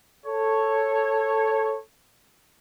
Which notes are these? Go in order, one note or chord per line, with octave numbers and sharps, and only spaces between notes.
A4 C#5